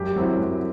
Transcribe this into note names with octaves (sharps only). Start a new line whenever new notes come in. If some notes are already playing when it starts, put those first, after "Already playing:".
Already playing: F#2 G4
F#3 C4 E4
F#2